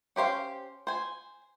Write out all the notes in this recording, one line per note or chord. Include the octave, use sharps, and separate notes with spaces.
C#4 G4 C5 F5
C5 G#5